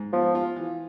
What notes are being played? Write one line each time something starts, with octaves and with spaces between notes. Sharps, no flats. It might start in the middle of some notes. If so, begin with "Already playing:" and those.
Already playing: G#2
F3 B3
F4
E3